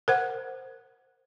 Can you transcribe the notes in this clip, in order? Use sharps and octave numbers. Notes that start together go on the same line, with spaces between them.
A#4 C5 F#5